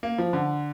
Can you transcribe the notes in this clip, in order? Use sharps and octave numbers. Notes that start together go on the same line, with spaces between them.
A#3
F3
D3